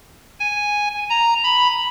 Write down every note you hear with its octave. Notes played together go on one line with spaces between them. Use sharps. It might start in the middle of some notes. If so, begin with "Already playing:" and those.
G#5
A#5
B5